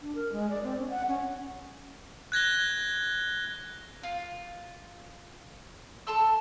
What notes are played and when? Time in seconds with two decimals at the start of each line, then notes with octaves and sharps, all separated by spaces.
0.01 D4
0.15 A#4
0.32 G#3
0.50 D5
0.63 C4
0.78 C#4
0.90 F#5
1.08 C#4
2.32 F#6 G#6 A#6 G7
4.03 F4
6.07 A4 A5 C6 E6